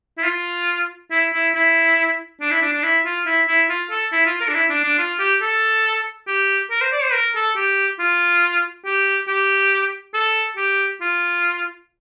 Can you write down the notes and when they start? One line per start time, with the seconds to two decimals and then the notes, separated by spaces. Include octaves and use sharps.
0.18 E4
0.25 F4
1.11 E4
1.33 E4
1.55 E4
2.41 D4
2.51 E4
2.62 D4
2.73 D4
2.83 E4
3.05 F4
3.26 E4
3.48 E4
3.70 F4
3.90 A4
4.12 E4
4.26 F4
4.41 A#4
4.48 D4
4.55 E4
4.70 D4
4.84 D4
4.99 F4
5.19 G4
5.42 A4
6.27 G4
6.71 A#4
6.81 C5
6.92 D5
7.03 C5
7.14 A#4
7.35 A4
7.56 G4
7.99 F4
8.86 G4
9.28 G4
10.14 A4
10.57 G4
11.01 F4